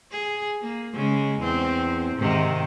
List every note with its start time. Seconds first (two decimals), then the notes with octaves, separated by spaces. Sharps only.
0.11 G#4
0.62 A#3
0.93 C#3 G#3
1.39 E2 C4
2.16 G#2 C3 D#3